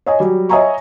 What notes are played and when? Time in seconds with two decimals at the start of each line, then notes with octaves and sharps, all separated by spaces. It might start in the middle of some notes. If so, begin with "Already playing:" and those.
0.06 C#5 D#5 G#5
0.20 F#3 G3
0.49 C#5 D#5 E5 G#5 A#5 C#6